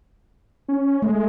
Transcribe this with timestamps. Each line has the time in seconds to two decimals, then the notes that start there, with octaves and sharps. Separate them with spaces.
0.68 C#4
1.02 G#3 A3